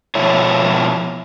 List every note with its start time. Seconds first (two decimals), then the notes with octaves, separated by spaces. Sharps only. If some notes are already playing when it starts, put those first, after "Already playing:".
0.15 B2 F3 E4 C#5